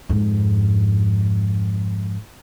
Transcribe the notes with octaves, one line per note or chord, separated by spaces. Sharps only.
F2 G#2